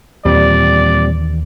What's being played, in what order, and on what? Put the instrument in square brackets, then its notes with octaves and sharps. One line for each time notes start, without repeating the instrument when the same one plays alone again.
[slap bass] D#2 E3 [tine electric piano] A#2 G3 C4 [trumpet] D5